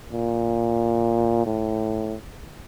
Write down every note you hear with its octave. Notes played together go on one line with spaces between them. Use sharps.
A#2
A2